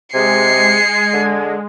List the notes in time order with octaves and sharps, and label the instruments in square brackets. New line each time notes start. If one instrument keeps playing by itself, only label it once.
[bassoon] C3 [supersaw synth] G#3 [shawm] G#5 [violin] C7 C#7
[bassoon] D3